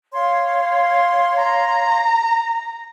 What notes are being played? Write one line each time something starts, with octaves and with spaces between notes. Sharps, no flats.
C#5 F5 C6
A#5